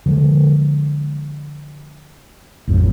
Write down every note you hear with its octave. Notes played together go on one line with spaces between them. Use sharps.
D3 F3 G3 G#3
A1 F2 A2 F#3